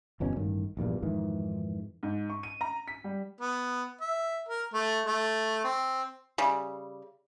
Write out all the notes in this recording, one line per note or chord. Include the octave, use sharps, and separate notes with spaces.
G1 E2 B2 C#4
A1 G2 D#3
A#1 E2 G2 A#2
F2 G#2 D#3 E3
G#2
C#6
D#7
A#5
B6
G3
B3
E5
A#4
A3
A3
C4
C#3 G3